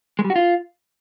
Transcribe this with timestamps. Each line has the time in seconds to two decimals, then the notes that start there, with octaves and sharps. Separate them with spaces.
0.19 G#3
0.24 G3
0.30 F#4
0.36 F4